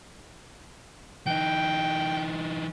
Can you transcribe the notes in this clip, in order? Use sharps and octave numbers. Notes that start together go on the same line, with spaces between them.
E3 D#4 G5